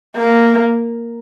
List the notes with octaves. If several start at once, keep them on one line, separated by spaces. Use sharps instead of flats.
A#3